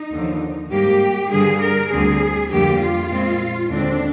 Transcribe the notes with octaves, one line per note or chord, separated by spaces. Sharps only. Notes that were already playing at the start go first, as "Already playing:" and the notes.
Already playing: D#4
D#2 D3 F3
G#2 G3 A#3 G4
G2 D3 G3 A#3 G#4
A#4
D2 D3 G3 C4 G#4
F2 D3 G3 A#3 G4
F4
A#2 G#3 C4
D#2 D3 G#3 C4 D4